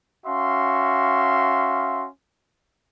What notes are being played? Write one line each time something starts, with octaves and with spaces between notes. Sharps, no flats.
C#4 F#4 E5 F5 C6